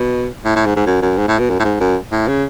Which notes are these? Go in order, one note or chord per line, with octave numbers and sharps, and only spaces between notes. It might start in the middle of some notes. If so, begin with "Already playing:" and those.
Already playing: B2
A2
A2
G#2
G#2
F#2
F#2
G#2
A2
B2
F#2
A2
G#2
F#2
A2
C#3